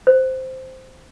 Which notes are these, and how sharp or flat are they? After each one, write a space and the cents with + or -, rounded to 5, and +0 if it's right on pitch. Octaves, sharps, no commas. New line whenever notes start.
C5 -5